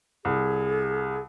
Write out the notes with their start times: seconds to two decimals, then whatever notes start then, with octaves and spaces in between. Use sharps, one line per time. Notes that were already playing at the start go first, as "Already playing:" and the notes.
0.25 C2 G#4